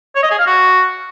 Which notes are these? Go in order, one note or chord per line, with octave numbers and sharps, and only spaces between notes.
C#5
D#5
G#4
F5
F#4